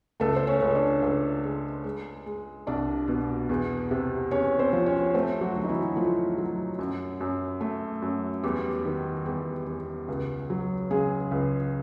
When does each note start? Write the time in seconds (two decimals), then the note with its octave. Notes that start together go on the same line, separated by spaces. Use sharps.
0.20 C#2 A3 A4
0.36 C5
0.47 C#4 C#5
0.61 C#2
0.75 D4 D5
1.02 C#2
1.44 G#3
1.84 G#3
2.26 G#3
2.67 C2 D4 D5
3.08 B2
3.49 E2
3.91 C3
4.31 E2 C#4 C#5
4.59 C4 C5
4.73 F3
4.86 C#4 C#5
5.14 A3 C4 C5
5.41 F#3 F#4
5.55 D2
5.64 D#4
5.68 E3 E4
5.96 F3 A3 F4
6.38 F#3
6.79 F#2
7.21 F#2
7.61 A3
8.02 F#2
8.43 E2 G3 G4
8.85 D#3
9.25 E2 G3 G4
9.67 E2
10.08 C#2
10.50 F#3
10.91 C#3 G#3 G#4
11.31 C#2